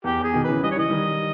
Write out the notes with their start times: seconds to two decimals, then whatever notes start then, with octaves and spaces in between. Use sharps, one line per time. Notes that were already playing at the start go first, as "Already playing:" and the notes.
0.04 E2 G4
0.19 E2 G#4
0.33 B2 D#3
0.44 C#3 E3 B4
0.63 G3 D#5
0.71 C#5
0.76 E3 D#5
0.90 D#3 G3